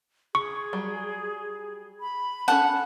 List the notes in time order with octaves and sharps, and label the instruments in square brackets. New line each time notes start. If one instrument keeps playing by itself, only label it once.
[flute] G#4 [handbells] C#6
[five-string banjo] F#3 G3
[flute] B5
[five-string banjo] C#4 A4 A5 [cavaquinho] F#5